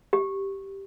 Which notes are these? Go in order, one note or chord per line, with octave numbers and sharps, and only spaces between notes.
G4